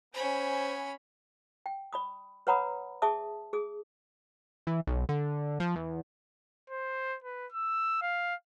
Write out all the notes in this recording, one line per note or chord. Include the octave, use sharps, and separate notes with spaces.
B3 C#4 C5 G#5 B5
G5
D5 B5 D#6
B4 C#5 F#5 A#5 B5 D#6
G#4 D5 E5 A5 D#6
G#4 D#6
E3
B1
D3
F3
E2
C5
B4
E6
F5